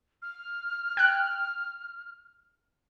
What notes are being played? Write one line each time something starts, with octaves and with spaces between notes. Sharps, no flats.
F6
G5 F#6